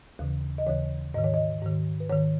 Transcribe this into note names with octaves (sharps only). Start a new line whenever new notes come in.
D#2 C#3 E3
D#5
D#2 C#3 E3 C#5
G#2 D#3 D#5
C#5
D#5
G#2 D#3
B4
G#2 D#3 C#5